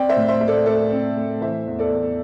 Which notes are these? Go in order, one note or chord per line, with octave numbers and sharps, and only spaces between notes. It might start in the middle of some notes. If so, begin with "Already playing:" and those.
Already playing: C4 D5 G5
C5 E5
A2
C5 E5
A2 E5
A4 D5
A3 A4 D5
C4
A2
E3 C5 E5
E2
A4 D5
E2